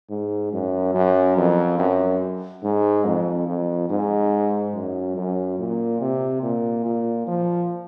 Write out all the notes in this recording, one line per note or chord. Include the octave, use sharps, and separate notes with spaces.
G#2
F#2
F#2
F2
F#2
G#2
F2
F2
G#2
F#2
F#2
A#2
C3
A#2
A#2
F3